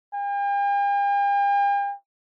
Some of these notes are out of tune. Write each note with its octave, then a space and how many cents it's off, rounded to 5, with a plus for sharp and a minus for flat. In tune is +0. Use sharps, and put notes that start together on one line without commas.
G5 +45